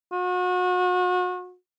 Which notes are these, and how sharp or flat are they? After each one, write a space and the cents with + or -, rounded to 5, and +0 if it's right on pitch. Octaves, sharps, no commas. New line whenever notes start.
F#4 -35